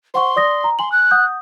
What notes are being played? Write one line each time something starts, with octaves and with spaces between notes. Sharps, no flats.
C5 F#5 C6 C#6
D5 D#6 A#6
A#5
G#5 C6 F#7
F#6
F#5 D#6 G6